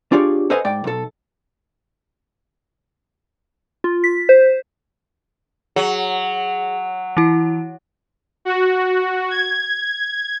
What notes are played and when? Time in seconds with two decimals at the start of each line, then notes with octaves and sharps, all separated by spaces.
0.12 D4 F4 G4 G#4 C#5 D5
0.50 A4 B4 C5 D#5 F5 G#5
0.65 G#2 D5 G5
0.84 B1 A4
3.84 F4
4.04 B6
4.29 C5
5.76 F#3 G#4
7.17 E3 E4
8.45 F#4
9.30 G#6